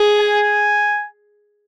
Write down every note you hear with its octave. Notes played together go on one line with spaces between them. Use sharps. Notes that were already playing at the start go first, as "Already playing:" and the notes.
Already playing: G#4
G#5